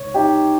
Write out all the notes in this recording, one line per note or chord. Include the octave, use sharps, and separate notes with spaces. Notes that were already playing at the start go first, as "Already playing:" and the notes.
Already playing: C#2 C3 C#5
D#4 G4